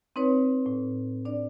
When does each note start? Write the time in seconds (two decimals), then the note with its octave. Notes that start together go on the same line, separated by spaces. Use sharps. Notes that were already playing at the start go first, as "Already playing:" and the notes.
0.16 C4 D#4 B4 C#5
0.66 A2
1.25 D4 D5